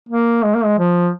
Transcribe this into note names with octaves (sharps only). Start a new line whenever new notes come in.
A#3
G#3
A#3
G#3
F3